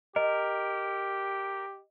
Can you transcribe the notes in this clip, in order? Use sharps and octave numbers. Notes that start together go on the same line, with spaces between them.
G4 A#4 D#5